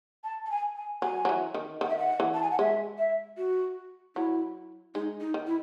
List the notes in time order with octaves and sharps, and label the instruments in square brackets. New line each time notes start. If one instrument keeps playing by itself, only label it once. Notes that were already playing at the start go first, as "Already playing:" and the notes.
[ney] A5
A5
G#5
G#5
[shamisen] F#3 [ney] G#5
[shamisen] F#3
E3
D#3
[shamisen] D#3 [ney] F#5
[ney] E5
F#5
[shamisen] E3
[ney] A5
G#5
F#5
[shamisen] G#3 [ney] E5
[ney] E5
F#4
[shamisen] F#3 [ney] E4
[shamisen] G#3 [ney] D#4
[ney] D#4
[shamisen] D#3
[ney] E4